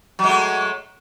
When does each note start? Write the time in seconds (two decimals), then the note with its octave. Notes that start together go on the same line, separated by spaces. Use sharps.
0.19 F#3
0.24 G#3
0.29 A3